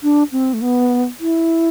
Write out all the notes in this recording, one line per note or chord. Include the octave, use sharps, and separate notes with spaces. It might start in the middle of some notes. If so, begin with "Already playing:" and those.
D4
C4
A3
B3
E4